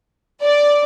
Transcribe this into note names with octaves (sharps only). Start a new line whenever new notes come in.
D5